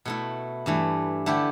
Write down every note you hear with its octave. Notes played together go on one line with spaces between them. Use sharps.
B2 A3 E4
G2 E3 A3
D3 A3 E4 G4